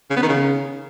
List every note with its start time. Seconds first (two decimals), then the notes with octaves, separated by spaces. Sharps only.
0.10 C#3
0.16 B3
0.22 D#3
0.29 C#3